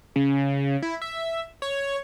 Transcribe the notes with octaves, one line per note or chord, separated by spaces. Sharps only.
C#3
E4
E5
C#5